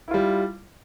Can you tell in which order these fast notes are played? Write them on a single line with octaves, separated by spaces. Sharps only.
E4 F4 G3